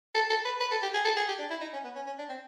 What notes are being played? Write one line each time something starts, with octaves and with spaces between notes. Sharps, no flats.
A4
A4
B4
B4
A4
G4
G#4
A4
G#4
G4
D4
E4
D#4
C#4
B3
C#4
C#4
D4
C4